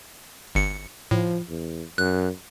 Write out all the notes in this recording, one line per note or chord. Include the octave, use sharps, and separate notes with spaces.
G1 C#7
A2 F3
E2
F#2 F#6